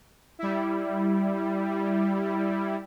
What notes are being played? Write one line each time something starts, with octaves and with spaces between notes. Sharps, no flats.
G3 E4